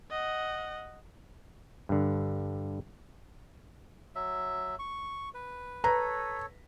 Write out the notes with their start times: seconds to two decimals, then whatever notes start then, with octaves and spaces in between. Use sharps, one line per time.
0.11 D#5 F#5
1.89 G2 D3
4.15 F#3 E5
4.79 C#6
5.34 B4
5.84 A4 B4 C#5 A#5